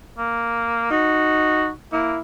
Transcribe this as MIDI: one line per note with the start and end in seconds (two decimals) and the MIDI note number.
0.18 0.87 58
0.91 1.70 63
0.91 1.69 66
1.92 2.15 58
1.92 2.20 64